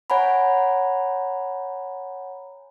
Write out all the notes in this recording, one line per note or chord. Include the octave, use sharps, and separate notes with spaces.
C#5 F#5 G#5 A#5 B5